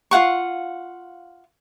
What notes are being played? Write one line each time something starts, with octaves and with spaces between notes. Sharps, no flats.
F4 F5 F#5 C#6